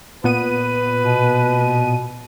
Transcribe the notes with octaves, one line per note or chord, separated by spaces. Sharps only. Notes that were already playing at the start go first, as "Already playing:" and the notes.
A#2 B3 B4 D#7
B2